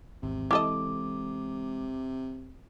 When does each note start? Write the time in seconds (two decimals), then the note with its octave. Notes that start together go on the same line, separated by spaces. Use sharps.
0.23 G#1 E2 C3
0.51 E3 G#3 E4 A4 D#5 D6